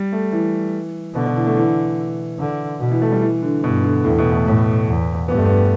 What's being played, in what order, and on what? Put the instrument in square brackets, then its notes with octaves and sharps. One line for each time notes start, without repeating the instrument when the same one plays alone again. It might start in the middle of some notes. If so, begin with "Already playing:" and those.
Already playing: [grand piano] G3
A3
E3
[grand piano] B2 [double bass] D3
[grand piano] B2
E3
A3
E3
[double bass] D3
B2
[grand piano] E3
A3
G3
E3
D3
[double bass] G2 [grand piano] B2
[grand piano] D3
[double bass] E2 [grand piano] A2
[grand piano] B2
A3
[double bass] A2
E2
[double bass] G2 [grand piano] B3
[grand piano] A3
B3